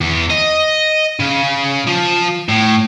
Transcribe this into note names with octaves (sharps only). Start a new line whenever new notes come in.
E2
D#5
C#3
F3
A2